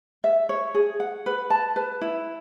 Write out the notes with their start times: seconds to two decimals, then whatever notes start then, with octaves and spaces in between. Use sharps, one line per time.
0.24 E5
0.49 C#5
0.74 G#4
1.00 F#5
1.26 B4
1.50 A5
1.76 B4
2.01 E4